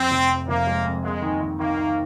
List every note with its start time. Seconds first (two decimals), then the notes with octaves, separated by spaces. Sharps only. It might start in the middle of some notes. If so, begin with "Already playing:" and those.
Already playing: F2 C4
0.11 F1
0.29 F2
0.48 F1 A#3
0.67 G#3
0.85 F2
1.04 G#3 A#3
1.22 D#3
1.41 D#3
1.59 D#3 A#3
1.77 D#3